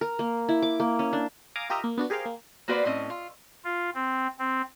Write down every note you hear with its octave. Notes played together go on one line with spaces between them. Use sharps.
A#4
A#3
E4
D6
A#3
C#4
D4
F5 G#5 A#5 D6 D#6
F4 G4 A#4 D#5 E5 A#5
A#3
B3 D4 F#4
G4 G#4 A#4 C5 F5 G5
A#3
A#3 B3 F#4 B4 C5 D5
A2 C4 C#4 D#5
F4
F4
C4
C4